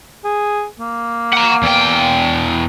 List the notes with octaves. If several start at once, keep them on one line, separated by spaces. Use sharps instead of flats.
G#4
A#3
F#5 A#5
E2 G5